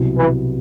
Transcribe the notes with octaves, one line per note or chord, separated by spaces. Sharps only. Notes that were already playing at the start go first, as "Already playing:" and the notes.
Already playing: C2 B2 F#3 B3 E4
E3